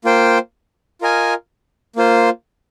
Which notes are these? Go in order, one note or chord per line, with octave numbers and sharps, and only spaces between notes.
A#3 F4 C5 G5
F4 A#4 D#5 G#5
A#3 F4 C5